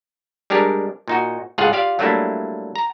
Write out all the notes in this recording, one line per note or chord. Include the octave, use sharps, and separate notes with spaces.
G3 G#3 D4 G4 A#4
A#2 D#4 F#4
C#2 A2 F4 G#4 F5 F#5
F4 G4 D5 F5
F#3 G3 A3 A#3 D4 E4
A#5